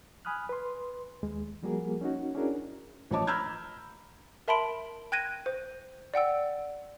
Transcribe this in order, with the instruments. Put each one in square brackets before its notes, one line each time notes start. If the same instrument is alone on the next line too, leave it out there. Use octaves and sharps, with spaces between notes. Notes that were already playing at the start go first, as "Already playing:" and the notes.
[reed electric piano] G#5 B5 D#6 F6 F#6
B4 C6
D#2 G#3
F3 G3 A#3 F#4 G#4 A#4
C#4 D#4 F#4
C#4 D4 E4 F#4 G#4 A#4
[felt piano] A1 F3 C#5 D#5 A5 D6
A#5 B5 E6 F6 G6 G#6
[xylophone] A#4 E5 A5 B5 C6 D7
G5 F#6 G#6 A#6 D#7
C5
D5 F#5 G5 E6